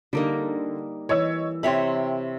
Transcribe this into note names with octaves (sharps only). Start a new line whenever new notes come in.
D3 G3 A#3 D#4
E3 C#5 D#5 E6
C3 C#5 E5 G5 B5 C6